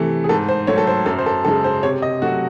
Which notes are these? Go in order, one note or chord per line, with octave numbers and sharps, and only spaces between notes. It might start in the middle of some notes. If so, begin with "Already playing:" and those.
Already playing: C3 E3 A3
G#4
G#2 A4
C5
F#3 A3 C#5
A4
C5
F#2 A4
C5
A4
C#3 G#3 A4
C5
C3 C#5
D#5
F#3 A3 F#4